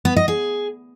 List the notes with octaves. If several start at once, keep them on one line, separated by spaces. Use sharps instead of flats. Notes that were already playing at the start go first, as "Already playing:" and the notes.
B3
D#5
G#4